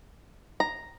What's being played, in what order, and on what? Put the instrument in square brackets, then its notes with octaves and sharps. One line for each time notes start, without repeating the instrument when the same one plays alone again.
[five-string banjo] A#5